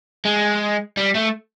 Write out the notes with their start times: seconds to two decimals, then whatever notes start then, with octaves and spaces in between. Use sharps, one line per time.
0.25 G#3
0.97 G3
1.15 A3